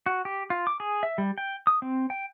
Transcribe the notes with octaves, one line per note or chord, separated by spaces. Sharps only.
F#4
G4
F4
D6
G#4
E5
G3
G5
D#6
C4
G5